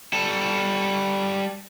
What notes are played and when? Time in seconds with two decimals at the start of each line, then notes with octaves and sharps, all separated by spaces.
0.13 G3 A4